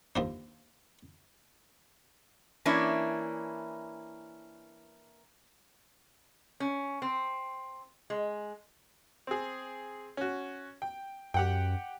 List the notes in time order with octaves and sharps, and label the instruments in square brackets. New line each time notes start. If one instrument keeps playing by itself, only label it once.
[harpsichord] D#2 F3 D4
[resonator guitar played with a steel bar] E3 A#3 C#4 D4 E4
C#4
C4
G#3
[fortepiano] C4 G#4
C#4 F#4
G5
[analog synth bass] F#2 [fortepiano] G4 F#5 G5